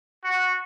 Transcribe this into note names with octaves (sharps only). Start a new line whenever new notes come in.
F#4